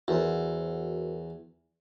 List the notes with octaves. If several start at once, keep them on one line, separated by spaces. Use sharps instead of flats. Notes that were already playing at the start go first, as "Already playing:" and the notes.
E2 F#4 A#4 C5